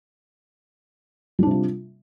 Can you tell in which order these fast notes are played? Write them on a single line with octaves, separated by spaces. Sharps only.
G3 D4 C3 F4